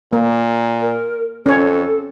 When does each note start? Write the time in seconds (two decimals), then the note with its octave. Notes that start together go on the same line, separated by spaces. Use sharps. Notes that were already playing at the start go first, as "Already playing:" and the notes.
0.13 A#2 A#3
0.81 A#4
1.46 F2 C#4 A4 C#5